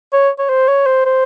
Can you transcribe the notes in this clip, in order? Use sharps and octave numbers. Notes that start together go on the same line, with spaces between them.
C#5
C#5
C5
C#5
C5
C5